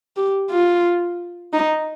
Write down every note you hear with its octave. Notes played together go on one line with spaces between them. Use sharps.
G4
F4
D#4